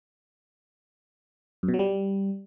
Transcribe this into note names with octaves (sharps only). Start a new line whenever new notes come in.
F#2
B2
F#3
G3